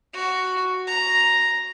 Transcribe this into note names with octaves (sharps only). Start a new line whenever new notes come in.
F#4
A#5